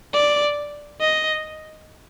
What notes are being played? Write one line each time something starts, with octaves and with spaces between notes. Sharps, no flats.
D5
D#5